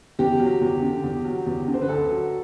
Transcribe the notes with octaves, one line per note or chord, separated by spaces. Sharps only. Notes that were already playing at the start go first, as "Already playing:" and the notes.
E2 G4
F#3
E2
D3
E2
F#3
E2
D3
C5
B4
D2 A4
F#3